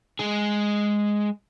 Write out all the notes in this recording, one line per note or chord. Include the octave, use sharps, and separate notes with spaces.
G#3 G#4